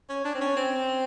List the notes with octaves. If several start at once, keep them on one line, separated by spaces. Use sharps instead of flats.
C#4
D4
C4
C#4
C4